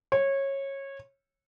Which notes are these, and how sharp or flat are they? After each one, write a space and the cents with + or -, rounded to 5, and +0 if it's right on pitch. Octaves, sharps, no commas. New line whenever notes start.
C#5 -20